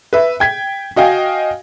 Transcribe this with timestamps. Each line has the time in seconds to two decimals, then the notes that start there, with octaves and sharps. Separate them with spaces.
0.13 B4 E5
0.40 G5 G#6 B6
0.96 F#4 D#5 F5 G5 G#5